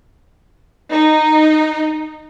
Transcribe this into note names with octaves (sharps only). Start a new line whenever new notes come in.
D#4